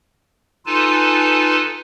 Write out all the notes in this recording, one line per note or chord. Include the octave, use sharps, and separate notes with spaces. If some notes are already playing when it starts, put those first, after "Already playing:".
D#4 F4 A4 B4 G#5 A5